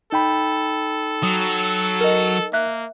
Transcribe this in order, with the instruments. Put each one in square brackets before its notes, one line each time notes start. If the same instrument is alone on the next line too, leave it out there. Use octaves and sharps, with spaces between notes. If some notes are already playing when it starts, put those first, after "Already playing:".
[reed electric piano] D#4 G5 B5 [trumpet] A4
[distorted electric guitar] F#3 [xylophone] D#6
[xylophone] A#4 D#5
[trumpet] A#3 [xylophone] E5 F#6